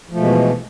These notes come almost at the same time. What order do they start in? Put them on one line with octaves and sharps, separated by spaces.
F3 A3 B2 G#3 E3